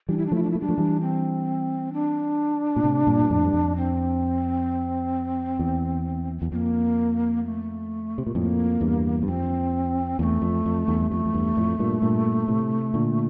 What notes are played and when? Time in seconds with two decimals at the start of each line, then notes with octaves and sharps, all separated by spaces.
0.09 E3 G3 D4
0.17 E4
0.26 D4
0.32 F3 A3 E4
0.43 D4
0.51 E4
0.55 A3
0.60 G3 D4
0.69 F3 A3
0.78 E3 G3
1.01 C4
1.93 D4
2.76 A#2
2.84 A2 C3
3.07 G2 A#2
3.22 G2
3.30 F2 A2
3.45 G2
3.53 F2
3.77 C4
5.59 E2
6.42 E2
6.52 F2 A#3 C4
7.44 A3
8.18 C3
8.27 A#2
8.35 F2 A2 A#3
8.81 E2 G2
9.23 G2
9.27 F2 C4
10.19 E2 A#3
10.23 A3
10.42 F2
10.66 F2
10.87 E2 G2
11.00 G2
11.11 F2 A3
11.26 F2
11.34 E2 G2
11.57 F2 A2
11.79 G2 A#2
12.02 G2 A#2
12.48 A2 C3
12.94 A#2 D3